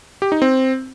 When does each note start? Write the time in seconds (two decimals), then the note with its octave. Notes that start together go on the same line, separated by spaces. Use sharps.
0.22 G4
0.32 D#4
0.42 C4